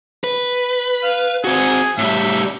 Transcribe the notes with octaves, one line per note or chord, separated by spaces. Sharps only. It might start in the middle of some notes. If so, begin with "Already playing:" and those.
B4
F5
C4 F#4 G#4
A2 G3 E5